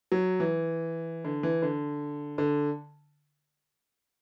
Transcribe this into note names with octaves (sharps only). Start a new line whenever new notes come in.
F#3
E3
D3
E3
D3
D3